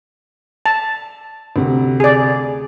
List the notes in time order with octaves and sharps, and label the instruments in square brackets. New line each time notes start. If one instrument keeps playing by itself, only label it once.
[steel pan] A5
[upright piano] D2 C3
[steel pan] G#4 D5